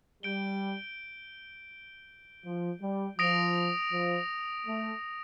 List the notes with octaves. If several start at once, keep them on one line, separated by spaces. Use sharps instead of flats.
G3 G6 D7 G7
F3
G3
F3 D#6 A#6 D7 F7
F3
A3